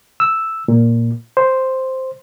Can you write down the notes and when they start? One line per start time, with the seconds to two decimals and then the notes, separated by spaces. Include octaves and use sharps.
0.20 E6
0.68 A#2
1.37 C5